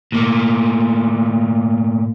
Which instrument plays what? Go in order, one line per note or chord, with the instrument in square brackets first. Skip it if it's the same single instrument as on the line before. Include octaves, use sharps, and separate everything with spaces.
[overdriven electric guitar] A2 A#3